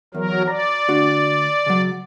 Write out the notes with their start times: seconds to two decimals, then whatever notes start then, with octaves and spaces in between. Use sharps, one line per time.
0.15 E2 F#3 A#4
0.48 D5 A#5
0.88 D2 D4 F#4
1.66 C#3 F#3